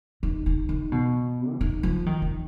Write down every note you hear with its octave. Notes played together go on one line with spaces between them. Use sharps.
D#3
D#3
D#3
B2
F3
D#3
F3
D#3
D#3